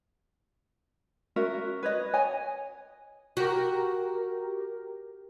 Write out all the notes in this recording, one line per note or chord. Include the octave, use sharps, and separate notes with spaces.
C#4 F#4 A#4 E5
B4 C#5 D#5
C#5 D#5 G#5
F#4 G4 A#4